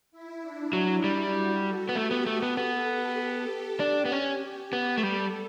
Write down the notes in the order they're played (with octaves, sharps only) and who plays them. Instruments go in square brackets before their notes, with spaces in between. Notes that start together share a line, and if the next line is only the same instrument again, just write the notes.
[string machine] E4
D4
[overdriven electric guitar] F#3 [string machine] E4
[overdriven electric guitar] G3
[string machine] F#4
A4
[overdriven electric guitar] B3
[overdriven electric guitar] A3 [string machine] G4
[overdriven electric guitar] B3
A3
B3
[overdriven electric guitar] B3 [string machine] A4
[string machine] G4
A4
[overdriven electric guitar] D4 [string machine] G4
[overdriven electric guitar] B3
[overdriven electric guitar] C#4 [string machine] G4
[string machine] G4
[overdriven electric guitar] B3
A3
[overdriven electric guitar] G3 [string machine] A4